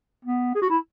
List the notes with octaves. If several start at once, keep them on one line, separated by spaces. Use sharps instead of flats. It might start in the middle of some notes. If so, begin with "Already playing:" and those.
B3
G#4
F#4
E4